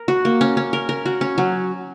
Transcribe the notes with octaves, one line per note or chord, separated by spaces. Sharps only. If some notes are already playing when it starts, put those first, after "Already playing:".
Already playing: A#4
F#4
A#3
C#4
C#4
A#4
A#4
F#4
C#4
F#3